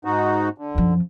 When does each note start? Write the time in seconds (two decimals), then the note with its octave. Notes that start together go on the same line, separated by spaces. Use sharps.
0.05 G#2 D#4 F#4
0.58 D3
0.75 F#2 F3